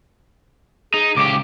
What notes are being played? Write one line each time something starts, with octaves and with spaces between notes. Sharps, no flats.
D#4 G#4
C#2 G4 D6